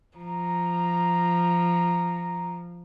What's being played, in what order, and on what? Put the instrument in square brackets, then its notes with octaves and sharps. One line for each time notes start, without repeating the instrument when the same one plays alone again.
[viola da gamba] F3 [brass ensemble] A#5